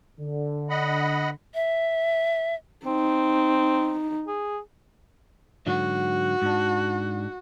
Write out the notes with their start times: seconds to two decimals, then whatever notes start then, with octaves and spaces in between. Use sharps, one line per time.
0.20 D3
0.70 D#5 F#5 B5
1.54 E5
2.86 C4 D#4
4.28 G#4
5.67 G#2 D3 F#3 F#4
6.42 G#2 D4